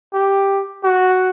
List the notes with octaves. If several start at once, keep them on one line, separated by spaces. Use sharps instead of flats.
G4
F#4